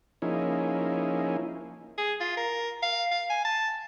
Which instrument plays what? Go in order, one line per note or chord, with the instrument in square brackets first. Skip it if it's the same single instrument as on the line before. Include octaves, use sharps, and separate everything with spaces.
[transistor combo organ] F3 A#3 C#4 D#4 E4 G#4
[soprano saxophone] G#4
F4
A#4
F5
F5
G#5
A5